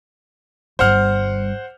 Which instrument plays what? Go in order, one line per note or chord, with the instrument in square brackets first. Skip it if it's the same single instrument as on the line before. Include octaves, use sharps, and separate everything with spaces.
[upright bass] G1 G3 [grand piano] C5 F#5 F6